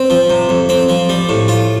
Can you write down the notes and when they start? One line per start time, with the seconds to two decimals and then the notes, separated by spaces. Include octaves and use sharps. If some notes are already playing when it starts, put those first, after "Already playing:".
Already playing: C4
0.10 F3
0.30 C3
0.49 F2
0.69 C4
0.89 F3
1.09 G3
1.29 A2
1.48 F4